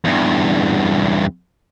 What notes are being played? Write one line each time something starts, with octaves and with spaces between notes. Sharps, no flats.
E2 G2